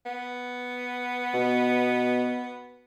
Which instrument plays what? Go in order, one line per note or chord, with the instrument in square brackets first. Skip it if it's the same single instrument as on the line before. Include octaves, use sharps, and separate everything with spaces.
[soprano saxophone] B3
[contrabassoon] B2